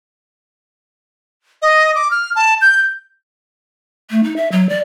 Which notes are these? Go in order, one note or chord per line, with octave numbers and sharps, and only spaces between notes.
D#5
D6
F6
A5
G6
A3
D#4
E5
F#3
D5